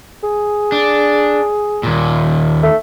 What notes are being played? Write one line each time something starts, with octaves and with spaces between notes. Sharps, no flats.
G#4
D4
D#2 A#2
A3